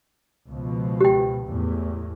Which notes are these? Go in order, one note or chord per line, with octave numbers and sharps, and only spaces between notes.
C#2 B2 F3
G4 G5
E2 A2